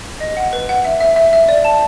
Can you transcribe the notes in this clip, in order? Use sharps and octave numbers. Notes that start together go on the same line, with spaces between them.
D#5
F#5
B4
F#5
E5
E5
E5
E5
D5
A5